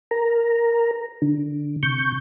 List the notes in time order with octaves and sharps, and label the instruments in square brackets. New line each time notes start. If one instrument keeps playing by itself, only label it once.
[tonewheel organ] A#4 A#5
D3
C3 C#6 G6